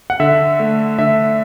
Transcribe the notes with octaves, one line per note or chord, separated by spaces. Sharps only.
F#5
D3 E5
A3
D3 E5